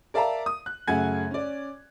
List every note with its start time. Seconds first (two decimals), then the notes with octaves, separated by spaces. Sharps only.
0.14 A#4 D5 E5 F5 A5 A#5
0.46 D#6
0.66 F#6
0.88 F#2 C#3 A3 F#5 G#5 G#6
1.31 C#4 D5